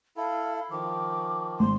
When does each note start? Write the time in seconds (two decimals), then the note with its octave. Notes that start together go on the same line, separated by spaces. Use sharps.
0.17 E4 A4 F5
0.71 D#3 F3 D6
1.60 G#1 C6